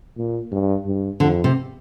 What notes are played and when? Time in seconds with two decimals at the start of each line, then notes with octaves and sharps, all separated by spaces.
0.17 A#2
0.52 G2
0.86 G2
1.20 F2 D3
1.44 C3